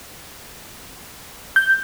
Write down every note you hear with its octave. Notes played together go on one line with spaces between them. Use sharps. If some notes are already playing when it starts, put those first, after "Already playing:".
G6